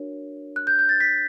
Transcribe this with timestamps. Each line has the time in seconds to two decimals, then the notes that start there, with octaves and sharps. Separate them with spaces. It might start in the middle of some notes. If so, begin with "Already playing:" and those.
Already playing: D4 F#4 A#4 C#5
0.56 F#6
0.67 G6
0.79 G6
0.89 A6
1.00 B6